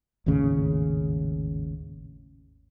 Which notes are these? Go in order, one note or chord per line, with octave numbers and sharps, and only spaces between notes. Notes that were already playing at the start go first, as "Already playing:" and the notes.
G#1 D#2 A2 C#3